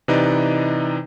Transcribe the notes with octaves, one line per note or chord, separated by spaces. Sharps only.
C3 E3 D#4 B4 D5 D#5